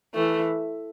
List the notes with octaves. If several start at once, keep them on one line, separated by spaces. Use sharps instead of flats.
E3 A3